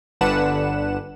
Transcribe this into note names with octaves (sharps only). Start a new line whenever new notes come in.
G1 D3 D4 B4 F#5 E7